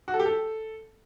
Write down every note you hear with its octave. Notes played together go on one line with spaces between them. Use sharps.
F#4
A4
G4
A4